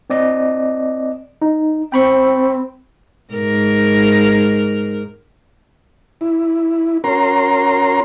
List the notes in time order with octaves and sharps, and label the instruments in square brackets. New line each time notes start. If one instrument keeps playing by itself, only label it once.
[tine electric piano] C4 D5 D#5
D#4
[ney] C4 [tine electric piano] G5 B5 C#6
[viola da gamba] G#2 A#4
[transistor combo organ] E4
C#4 F#4 A#4 A#5 C6